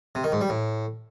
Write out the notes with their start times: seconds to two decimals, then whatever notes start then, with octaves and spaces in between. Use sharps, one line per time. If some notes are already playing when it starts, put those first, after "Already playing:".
0.15 C3
0.24 D#3
0.32 G#2
0.41 G3
0.49 A2